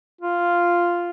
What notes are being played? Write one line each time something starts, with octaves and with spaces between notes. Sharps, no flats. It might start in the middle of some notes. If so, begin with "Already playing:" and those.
F4